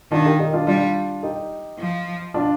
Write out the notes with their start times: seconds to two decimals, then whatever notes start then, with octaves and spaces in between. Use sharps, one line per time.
0.12 D#3 D4 F4
0.25 G4 A#4
0.39 D#4 G4
0.53 D4 F4
0.67 G3 D4 F4
1.23 D#4 G4
1.79 F3
2.34 D4 F4